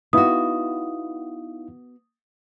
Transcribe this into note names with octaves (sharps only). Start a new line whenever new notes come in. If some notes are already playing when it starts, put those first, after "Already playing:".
B3 D#4 E4 F#4 F5 D#6